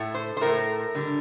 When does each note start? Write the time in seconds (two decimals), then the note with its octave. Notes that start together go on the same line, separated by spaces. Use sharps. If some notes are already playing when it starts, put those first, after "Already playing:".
Already playing: A2 A3
0.14 C5
0.37 C5
0.41 A2 A3 A#4
0.95 D3 G3